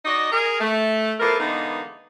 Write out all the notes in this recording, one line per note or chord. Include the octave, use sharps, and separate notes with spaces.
D#4 F#4 D5 D#5
G#4 A#4
A3
F3 A#3 B3 E4 A4 A#4
D3 E3 G#3 A#3 B3 D#4